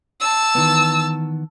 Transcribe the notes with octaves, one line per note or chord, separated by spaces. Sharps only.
A5 E6
D#3 E3 B3